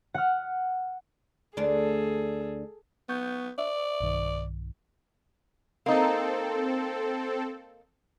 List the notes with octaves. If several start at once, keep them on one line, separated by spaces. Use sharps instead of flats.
F#5 F6
D2 D4 G#4 A4
B3 C#6 G6
D5 E5
B1 G2 D#3
A#3 C4 D#4 A4